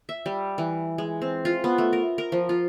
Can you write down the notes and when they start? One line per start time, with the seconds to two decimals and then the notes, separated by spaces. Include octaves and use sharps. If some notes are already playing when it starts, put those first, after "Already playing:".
0.09 E5
0.26 G3
0.58 E3
0.98 G#3
1.22 C4
1.45 F4
1.64 B3
1.78 A3
1.93 A#4
2.18 A#4
2.32 F3
2.49 F4